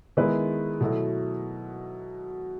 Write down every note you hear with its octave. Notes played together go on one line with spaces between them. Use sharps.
D#3 G#3 B3 E4 B4
B2 F#3 A3 E4